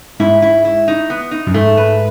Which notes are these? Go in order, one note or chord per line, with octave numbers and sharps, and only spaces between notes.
G#2 E4
E4
E4
D#4
B3
D#4
F#2
G#2 A3
B4